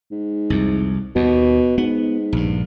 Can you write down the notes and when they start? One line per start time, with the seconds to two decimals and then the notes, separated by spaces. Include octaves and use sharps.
0.12 G#2
0.50 C2 F2
1.16 D#2 B2
1.78 G#2 B3
2.33 A#1 G2